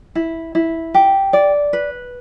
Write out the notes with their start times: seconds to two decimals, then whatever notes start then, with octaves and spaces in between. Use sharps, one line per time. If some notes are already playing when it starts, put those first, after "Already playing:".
0.15 E4
0.55 E4
0.94 G4
1.33 D5
1.73 B4